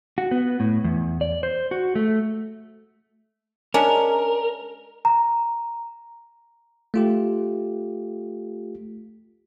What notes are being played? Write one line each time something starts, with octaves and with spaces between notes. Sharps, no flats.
F#4
B3
A2
E2
D5
C5
F#4
A3
G#3 C#4 D4 A#4
A#5
A3 F4 G4